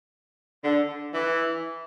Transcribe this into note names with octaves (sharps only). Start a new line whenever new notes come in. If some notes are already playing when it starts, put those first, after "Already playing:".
D3
E3